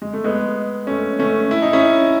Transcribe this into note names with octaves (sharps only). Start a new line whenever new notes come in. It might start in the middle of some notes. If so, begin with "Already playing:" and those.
G#3
A3
G#3 B3
A3 C#4
A3 C#4
E4
D#4
C#4 E4